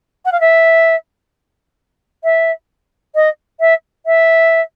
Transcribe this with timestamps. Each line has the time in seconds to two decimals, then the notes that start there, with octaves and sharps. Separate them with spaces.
0.25 F#5
0.32 F5
0.40 E5
2.23 E5
3.15 D#5
3.60 E5
4.06 E5